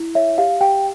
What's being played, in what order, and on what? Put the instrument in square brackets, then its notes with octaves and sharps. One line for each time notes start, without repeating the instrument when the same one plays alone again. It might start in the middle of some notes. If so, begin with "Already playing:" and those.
Already playing: [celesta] E4
C#5 E5
G4 F5
G4 G5